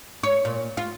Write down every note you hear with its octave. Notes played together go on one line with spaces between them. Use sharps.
C#5
A#2
F4